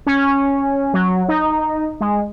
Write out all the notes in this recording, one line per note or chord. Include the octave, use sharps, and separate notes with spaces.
C#4
F#3
D#4
G#3